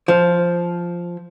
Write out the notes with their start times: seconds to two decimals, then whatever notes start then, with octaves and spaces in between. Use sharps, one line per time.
0.08 F3